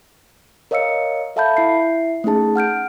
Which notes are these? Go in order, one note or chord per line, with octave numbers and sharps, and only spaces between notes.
A#4 C#5 D#5 F5 E6 C#7
A4 E5 F5 A5 B5 G6
E4 E5 C7
A3 C#4 D#4 G#4 A5
F#5 F6 G6 D7